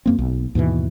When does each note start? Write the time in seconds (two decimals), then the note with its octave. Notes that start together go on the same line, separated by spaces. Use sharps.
0.06 F#2 A#3 C4
0.19 B1
0.55 D#2 G#2 B2 E3